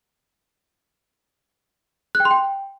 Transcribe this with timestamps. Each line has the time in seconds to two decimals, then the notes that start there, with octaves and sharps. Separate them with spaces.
2.15 F#6
2.20 G5
2.25 C6
2.31 G5